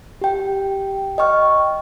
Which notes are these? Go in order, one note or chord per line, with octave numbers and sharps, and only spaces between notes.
G4 G5
D#5 G5 C#6 F6